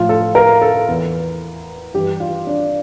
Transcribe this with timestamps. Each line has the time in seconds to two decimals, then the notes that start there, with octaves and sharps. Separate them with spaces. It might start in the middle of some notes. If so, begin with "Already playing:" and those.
Already playing: A2 F3 F4
0.09 A4
0.35 A#4
0.62 A4
0.88 E2 E3
1.94 G2 E3 G4
2.20 F4
2.47 D4